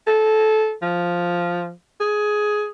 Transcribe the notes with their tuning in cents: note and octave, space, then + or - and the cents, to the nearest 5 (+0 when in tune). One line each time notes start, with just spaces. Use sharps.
A4 -20
F3 +0
G#4 +10